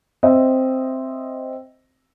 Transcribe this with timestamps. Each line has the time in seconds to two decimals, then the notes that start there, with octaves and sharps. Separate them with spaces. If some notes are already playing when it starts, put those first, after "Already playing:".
0.23 C4 D#5 E5